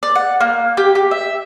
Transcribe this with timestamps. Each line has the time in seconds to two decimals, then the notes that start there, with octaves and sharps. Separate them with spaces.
0.03 D5
0.15 F#5
0.41 A#3
0.77 G4
0.95 G4
1.11 E5